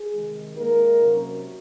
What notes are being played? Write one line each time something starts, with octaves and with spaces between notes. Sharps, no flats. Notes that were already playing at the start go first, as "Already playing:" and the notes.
Already playing: G#4
C3 D#3 G#3
A#2 G#3 A#3 D#4 A#4
C3 F#3 C#4